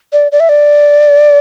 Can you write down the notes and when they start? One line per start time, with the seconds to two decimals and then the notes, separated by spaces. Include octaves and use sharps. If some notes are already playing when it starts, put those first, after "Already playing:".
0.13 D5
0.32 D5
0.40 E5
0.49 D5